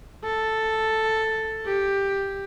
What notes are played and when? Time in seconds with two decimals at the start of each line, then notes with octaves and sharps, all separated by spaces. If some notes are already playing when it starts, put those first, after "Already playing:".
0.24 A4
1.65 G4